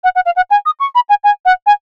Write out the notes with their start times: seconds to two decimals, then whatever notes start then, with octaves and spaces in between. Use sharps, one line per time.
0.04 F#5
0.15 F#5
0.25 F5
0.36 F#5
0.50 G#5
0.66 D#6
0.80 C#6
0.95 B5
1.09 G#5
1.24 G#5
1.45 F#5
1.66 G#5